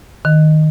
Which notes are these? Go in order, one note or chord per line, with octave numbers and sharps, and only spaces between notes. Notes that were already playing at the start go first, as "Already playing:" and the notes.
D#3